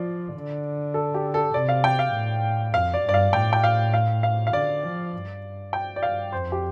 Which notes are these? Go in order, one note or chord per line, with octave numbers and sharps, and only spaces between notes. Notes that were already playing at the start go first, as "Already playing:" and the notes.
Already playing: F3 F4 D5
D3
A4
G4
A4
C3 D5
F5
G5
F5
A2
F2 F5
D5
G2 D5
F5
A2 G5
G5
F5
F5
F5
F5
D3 D5
F3
G2
G5
D5
G2 F5
F2 C5
G4